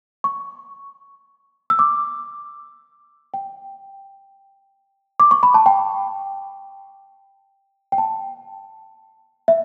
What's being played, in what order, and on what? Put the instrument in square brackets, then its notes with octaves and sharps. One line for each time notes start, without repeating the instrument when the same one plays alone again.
[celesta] C#6
E6
D6
G5
D6
C#6
B5
A5
G5
G5
A5
E5